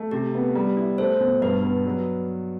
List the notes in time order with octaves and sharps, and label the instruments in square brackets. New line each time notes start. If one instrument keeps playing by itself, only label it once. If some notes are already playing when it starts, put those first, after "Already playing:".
Already playing: [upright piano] A3
[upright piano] C3 [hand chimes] G4
[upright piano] B3
G3
E4
[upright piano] A3 [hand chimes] C5
[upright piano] B2
[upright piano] G2 [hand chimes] B4
[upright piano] B3
F#3